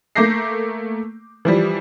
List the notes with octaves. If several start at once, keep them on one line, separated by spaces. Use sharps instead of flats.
A3 A#3 D6 G6 A#6 C7
E3 F3 G3